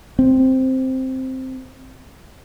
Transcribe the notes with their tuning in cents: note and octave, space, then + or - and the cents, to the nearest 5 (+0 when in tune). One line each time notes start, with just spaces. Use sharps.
C4 +0